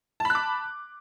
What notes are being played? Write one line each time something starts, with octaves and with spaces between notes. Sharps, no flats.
A5 B5 D6 F#6